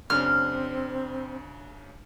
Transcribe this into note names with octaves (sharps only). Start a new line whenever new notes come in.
F#2 C#3 C4 D4 F6